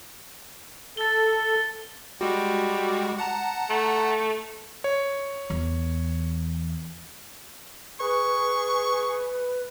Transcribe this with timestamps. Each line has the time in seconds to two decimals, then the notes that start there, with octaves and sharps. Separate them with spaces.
0.97 A4 A6 G7
2.21 G3 G#3 F#4
3.18 F#5 A5 A#5
3.70 A3
4.84 C#5
5.50 E2
8.00 G#4 B4 C#6